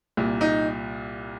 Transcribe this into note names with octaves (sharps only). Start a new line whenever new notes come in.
C2 A#2
D#4